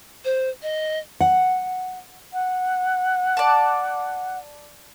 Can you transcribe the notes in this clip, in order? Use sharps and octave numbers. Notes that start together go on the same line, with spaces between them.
C5
D#5
F#5
F#5
D5 A5